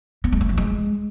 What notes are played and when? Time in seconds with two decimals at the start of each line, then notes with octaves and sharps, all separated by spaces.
0.24 B3
0.32 G#3
0.41 A3
0.49 F3
0.58 G#3